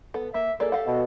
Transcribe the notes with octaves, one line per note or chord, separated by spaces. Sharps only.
B3 A4
A#3 E5
A#3 G#4 A4 D5
G4 F5 F#5
B2